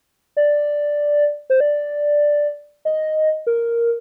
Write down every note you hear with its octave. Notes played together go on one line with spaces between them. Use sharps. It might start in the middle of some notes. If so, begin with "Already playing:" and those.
D5
C5
D5
D#5
A#4